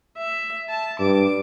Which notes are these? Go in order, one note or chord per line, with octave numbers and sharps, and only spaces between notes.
E5
A5
G2 D6